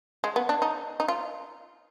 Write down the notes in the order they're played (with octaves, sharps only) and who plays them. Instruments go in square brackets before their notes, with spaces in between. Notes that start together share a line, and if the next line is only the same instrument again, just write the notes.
[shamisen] G#3
B3
D4
D#4
D#4
F4